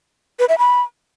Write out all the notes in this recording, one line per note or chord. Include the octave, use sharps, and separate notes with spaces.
B4
E5
B5